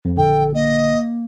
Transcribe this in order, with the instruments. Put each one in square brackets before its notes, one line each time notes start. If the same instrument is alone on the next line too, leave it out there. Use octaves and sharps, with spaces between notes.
[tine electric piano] F2
[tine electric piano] A#1 D3 [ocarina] A4 [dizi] G5
[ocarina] A#3 [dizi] D#5